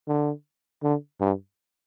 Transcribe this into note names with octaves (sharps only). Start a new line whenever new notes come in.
D3
D3
G2